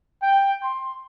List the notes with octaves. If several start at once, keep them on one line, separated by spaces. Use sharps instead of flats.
G5
C6